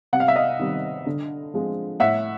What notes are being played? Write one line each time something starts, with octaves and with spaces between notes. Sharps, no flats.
C3 F#5
F5
E5
D#5 F5
D#3 G3 C4
D3
F3 G#3 C4
A2 E5 F#5